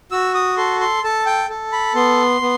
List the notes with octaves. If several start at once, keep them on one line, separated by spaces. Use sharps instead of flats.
F#4 E6
D#6
A4 C6
C6
A4 A5
G5
A4
B5
B3 C6
B3